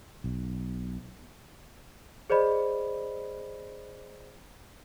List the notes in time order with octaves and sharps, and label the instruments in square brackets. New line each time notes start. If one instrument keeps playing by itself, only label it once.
[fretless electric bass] B1
[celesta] G#4 C5 D5 D#5 B5